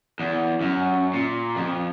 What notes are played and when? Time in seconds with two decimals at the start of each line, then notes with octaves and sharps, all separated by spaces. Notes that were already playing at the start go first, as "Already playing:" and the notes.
0.19 E2
0.61 F#2
1.14 A#2
1.56 F2